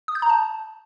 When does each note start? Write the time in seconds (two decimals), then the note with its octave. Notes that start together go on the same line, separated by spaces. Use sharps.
0.08 D#6
0.15 G6
0.22 A#5
0.29 A5